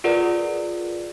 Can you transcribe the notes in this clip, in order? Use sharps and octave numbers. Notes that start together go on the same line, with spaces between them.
F4 G#4 A#4 B4 D5 F#5